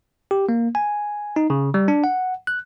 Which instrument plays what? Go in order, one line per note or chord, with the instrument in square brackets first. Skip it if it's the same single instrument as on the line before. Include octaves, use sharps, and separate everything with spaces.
[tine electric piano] G4
A#3
G#5
D#4
C#3
G3
D4
F#5
F#6